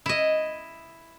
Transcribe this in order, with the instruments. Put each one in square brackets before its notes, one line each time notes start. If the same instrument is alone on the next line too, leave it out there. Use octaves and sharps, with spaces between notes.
[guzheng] E4 D#5